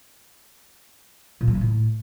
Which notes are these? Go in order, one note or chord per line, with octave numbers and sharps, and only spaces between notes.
A#2
G3
D3
A2